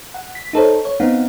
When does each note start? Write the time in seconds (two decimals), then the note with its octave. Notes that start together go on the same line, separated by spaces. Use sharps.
0.14 F#5
0.35 B6
0.53 D#4 A4 C5 C#5
0.85 C#5
1.00 B3 C4 D#4 F5 F#5